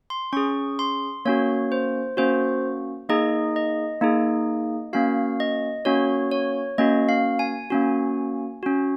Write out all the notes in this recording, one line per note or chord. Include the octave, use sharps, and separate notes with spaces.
C6
C#4 G#4 C#6
C6
A#3 C#4 F#4 C#5
C5
A#3 C#4 F#4 C5
A#3 D#4 G#4 D#5
D#5
A#3 D#4 G#4
A#3 C#4 F#4 F5
D#5
A#3 C#4 F#4 C#5
C#5
A#3 C#4 F#4 D#5
F5
G#5
A#3 C#4 F#4
C#4 F#4